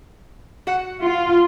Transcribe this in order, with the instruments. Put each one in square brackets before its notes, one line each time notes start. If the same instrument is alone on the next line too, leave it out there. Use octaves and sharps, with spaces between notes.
[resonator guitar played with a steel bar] F#4 F#5
[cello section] F4